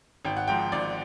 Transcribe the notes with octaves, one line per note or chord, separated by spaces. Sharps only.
G#1 G5
F#5
G#2 F3 G5
G#1 D5